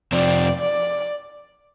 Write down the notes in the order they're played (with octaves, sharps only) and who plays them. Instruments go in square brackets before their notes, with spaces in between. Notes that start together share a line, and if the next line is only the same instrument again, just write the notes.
[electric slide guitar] F2 C3 F3 C4 [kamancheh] D5
[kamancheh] D5